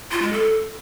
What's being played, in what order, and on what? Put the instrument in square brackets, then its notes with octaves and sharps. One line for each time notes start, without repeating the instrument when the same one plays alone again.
[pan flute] F4
G#3
A4